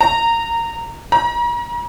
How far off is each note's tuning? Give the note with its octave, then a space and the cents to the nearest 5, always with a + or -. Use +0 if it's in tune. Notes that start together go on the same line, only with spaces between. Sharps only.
A#5 -15
A#5 +35